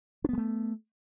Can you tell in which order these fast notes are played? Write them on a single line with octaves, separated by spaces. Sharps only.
D4 B3 G#3 A3